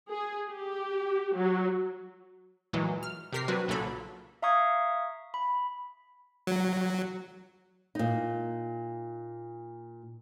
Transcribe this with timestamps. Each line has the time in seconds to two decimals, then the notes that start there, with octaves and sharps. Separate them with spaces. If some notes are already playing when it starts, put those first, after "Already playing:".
0.10 G#4
0.50 G4
1.35 F#3
2.73 A#2 E3 F#3 G#3
3.03 F6
3.33 C3 G4 A#4 B6 C7
3.48 F#3 C4 D4 F#4 B4
3.68 B1 A#2 C#3 F#3 A4 B5
4.42 E5 F5 A#5 C#6 D#6 G#6
5.34 B5
6.47 F#3
7.95 A#2 D#4